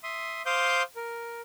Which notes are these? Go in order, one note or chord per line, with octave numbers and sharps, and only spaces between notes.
E5 C6 D#6
C5 F5 C6 D6 D#6 G6
A#4